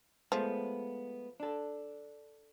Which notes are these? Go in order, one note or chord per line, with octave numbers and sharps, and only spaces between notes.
F3 G#3 A3 B3
D4 A4